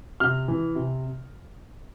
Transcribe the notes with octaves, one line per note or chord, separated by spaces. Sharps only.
C3 F6
E3
C3